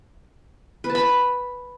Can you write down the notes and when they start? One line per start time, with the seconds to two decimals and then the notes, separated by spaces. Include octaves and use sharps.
0.84 B4
0.90 A5
0.95 B5